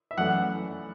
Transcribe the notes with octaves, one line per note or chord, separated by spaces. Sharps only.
E5
F#2 E3 A3 F#5